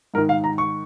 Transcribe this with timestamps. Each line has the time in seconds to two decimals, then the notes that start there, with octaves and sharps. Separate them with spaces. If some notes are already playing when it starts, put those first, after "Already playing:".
0.14 G#2 A#4
0.18 D#3
0.29 F5
0.44 A#5
0.58 C#6